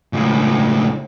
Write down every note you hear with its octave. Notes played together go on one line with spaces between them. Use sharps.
C#2 A2